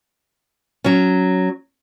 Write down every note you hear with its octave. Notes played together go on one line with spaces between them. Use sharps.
F#3 C#4